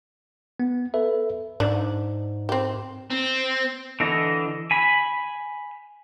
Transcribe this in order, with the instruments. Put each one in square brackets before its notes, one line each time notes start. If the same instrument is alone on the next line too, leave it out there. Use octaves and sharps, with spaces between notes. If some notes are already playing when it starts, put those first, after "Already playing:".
[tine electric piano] B3
A4 B4 E5
[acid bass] G#2 [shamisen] D4
[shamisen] C4 G4
[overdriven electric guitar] C4
[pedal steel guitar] D3 E3 D4 D#5
G#5 B5